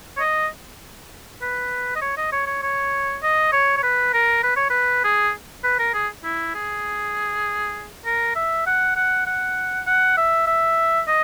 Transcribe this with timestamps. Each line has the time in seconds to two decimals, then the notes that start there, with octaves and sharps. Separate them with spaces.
0.17 C#5
0.20 D#5
1.41 B4
1.96 D#5
2.01 C#5
2.17 D#5
2.32 C#5
2.47 C#5
2.63 C#5
3.23 D#5
3.52 C#5
3.77 C#5
3.83 B4
4.13 A#4
4.44 B4
4.56 C#5
4.70 B4
5.04 G#4
5.64 B4
5.79 A#4
5.94 G#4
6.24 E4
6.55 G#4
8.05 A#4
8.36 E5
8.66 F#5
8.96 F#5
9.26 F#5
9.86 F#5
10.17 E5
10.47 E5
11.07 D#5